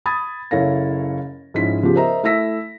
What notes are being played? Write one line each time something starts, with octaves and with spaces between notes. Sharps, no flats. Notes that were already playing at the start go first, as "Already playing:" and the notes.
B5 D#6 G#6 A6
F#1 E4 A4 C#5 F5 A#6
G#2 F3 G#3 C#4 E4 B6
C#3 F3 B3 F4 G4 G#4
A#4 C5 D#5 E5 A#5
A3 E4 E5 E6 A#6 B6